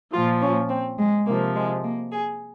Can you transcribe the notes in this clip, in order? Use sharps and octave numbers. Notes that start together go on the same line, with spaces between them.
A#2 F3 F4
C#4
C4
G#3
C3 F3 A#3
G#3
A#3
G#4